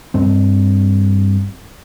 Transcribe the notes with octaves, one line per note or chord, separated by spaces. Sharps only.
G2 C4